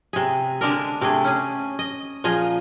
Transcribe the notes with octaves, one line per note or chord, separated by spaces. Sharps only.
C3 G#4
D3 G#3 D4 A#4
C3 A3 D4 G#4
C#4 G#4
D#5
A#2 F3 G#4 D#5